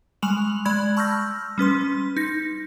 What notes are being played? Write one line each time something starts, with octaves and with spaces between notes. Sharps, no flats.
G3 G#3 G#5 C#6 F7 F#7
G#3 D5 B5 G#6
A5 C#6 E6 F6 G6 A#6
G3 C#4 B4 C6
D#4 A#6